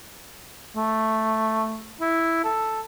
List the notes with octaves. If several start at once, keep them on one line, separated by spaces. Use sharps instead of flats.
A3
E4
A4